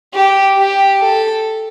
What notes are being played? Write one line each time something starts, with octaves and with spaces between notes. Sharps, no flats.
G4
G4
A4